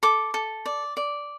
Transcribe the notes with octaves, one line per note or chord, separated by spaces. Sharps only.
A4 D6
A4
D5
D5